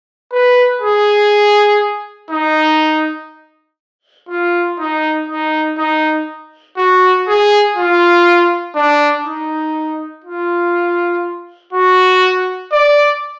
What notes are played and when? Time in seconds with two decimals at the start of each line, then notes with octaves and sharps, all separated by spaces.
0.32 B4
0.81 G#4
2.30 D#4
4.29 F4
4.79 D#4
5.29 D#4
5.78 D#4
6.77 F#4
7.27 G#4
7.76 F4
8.75 D4
9.25 D#4
10.24 F4
11.73 F#4
12.72 D5